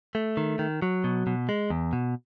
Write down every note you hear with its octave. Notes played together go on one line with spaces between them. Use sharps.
A3
D#3
D#3
F#3
B2
B2
G#3
E2
B2